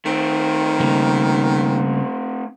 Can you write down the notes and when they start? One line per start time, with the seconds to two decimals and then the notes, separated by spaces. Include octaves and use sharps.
0.05 D#3 A3 C4
0.80 C#3 G3 A#3